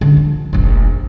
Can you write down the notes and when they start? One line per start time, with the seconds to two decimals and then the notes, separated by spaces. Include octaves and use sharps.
0.01 D3 C#4
0.17 F3
0.53 F1 A#1